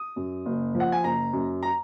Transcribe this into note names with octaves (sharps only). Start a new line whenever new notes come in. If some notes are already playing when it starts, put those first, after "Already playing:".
Already playing: D#6
F#2
F#1
F3
F#5
G#5
F#1 A#5
F#2
A#5